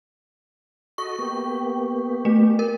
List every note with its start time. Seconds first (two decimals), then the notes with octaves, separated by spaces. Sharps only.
0.98 F#4 A4 D#5 C#6
1.19 A#3 B3 G4
2.25 A3
2.59 A#4